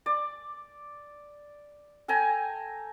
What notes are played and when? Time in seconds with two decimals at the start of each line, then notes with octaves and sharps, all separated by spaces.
0.06 D5
2.08 A4 G5 G#5 A#5